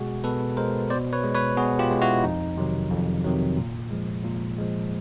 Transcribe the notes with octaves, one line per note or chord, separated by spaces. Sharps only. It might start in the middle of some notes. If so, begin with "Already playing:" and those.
Already playing: B2 G#3 F#4 G#4
B2 A4 B4
G#3 A#4 C5
B2 C5 D5
B4 C#5
G#3
B4 C#5
B2 F#4 G#4
F4 G4
G#3
E4 F#4
F2 D#4
C3 D#3 F#3
F2
C3 D#3 F#3
A#2
F3 G#3
A#2
F3 G#3